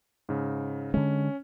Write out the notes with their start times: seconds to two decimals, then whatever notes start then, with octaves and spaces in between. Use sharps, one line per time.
0.29 G#2 C#3
0.94 D3 G#3 C#4